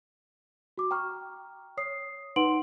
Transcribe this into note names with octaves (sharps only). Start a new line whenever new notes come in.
F#4 D6
G5 A#5 C#6 F6
C#5 D#6 C7
D#4 B4 F#5 C6 D7 F#7